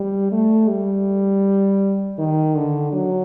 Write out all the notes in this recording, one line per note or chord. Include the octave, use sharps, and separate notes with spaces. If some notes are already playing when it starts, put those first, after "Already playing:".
Already playing: G3
A3
G3
D#3
D3
F#3